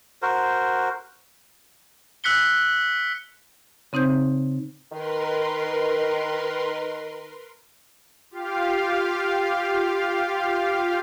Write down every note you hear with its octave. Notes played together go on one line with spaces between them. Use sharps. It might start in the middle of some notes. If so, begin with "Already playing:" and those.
F#4 A#4 C5
E6 F#6 B6 C#7 G7
C#3 C4 D#4 C5 G6
D#3 A#4 B4 C6
F4 G4 F5